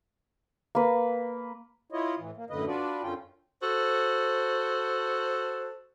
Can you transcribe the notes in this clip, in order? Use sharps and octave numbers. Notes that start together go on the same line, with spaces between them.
A#3 B4
E4 F4 C#5 D#5
A2 E3
A#3
F#2 A2 D3 B4 D#5
D4 F4 F#4 B4 D5
F#2 D3 C#4 F4 G5
F#4 A4 C5